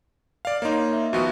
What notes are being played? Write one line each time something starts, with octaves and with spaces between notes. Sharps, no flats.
D5 F5
A#3 D#4 C#5 D#5 C6
E5
D#2 F3 B3 F#4